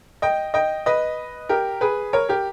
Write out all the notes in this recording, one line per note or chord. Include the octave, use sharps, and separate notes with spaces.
D#5 G5
D#5 G5
B4 D#5
G4 A#4
G#4 B4
A#4 C#5
G4 A#4